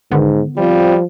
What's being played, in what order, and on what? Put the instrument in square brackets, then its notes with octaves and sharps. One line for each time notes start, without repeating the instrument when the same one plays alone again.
[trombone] G#2 [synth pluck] D3 D#3 B3
[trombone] F3 [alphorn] G3 [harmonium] C4 F4